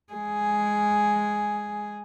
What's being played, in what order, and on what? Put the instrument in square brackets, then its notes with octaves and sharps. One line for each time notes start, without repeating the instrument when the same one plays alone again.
[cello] G#3 G#4